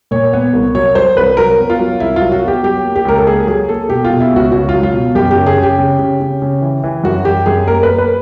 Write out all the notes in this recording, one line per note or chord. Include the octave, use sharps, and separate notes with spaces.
A#2 C#5
B3
C2
F#3 C#5
F#3 C5
C2 B4
F#3 A#4
B3
F4
F#3
C2 E4
F#3 F4
F#4
B3 G4
F#3 G4
A#3
G4
C#2 A#4
A4
A#3 G#4
F#3 G#4
A#3 A4
B2 G4
F4
B2
E4
C#2 F#4
C#2 F#4
F4
F#3
F4
B2
F#2 G4
G4
C#3
G#4
C#3
G4
C#3
C#3
C#3
C#3
E3
E3
F#2 F#4
G3 G4
F#2 G#4
A#3 A#4
B4
A#3
B4